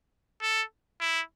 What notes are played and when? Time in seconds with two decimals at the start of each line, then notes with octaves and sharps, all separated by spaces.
0.42 A4
1.00 E4